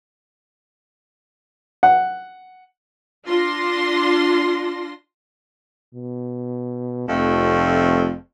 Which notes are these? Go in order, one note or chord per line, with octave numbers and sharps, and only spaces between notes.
F#5
D4 F4 C6 A#6
B2
F1 F2 A3